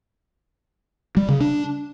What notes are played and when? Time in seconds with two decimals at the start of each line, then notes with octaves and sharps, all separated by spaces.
1.17 G3
1.29 C#3
1.41 D4